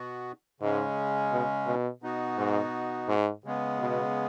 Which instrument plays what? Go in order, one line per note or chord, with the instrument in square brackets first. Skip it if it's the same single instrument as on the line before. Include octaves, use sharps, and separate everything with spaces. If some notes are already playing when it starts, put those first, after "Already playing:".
Already playing: [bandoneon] B2 B3 F#4
[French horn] G#2 [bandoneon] C#3 G#3 C#4
[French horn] B2
B2
[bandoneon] B2 B3 D#4 F#4
[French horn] G#2
G#2
[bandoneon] C#3 G#3 B3
[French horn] B2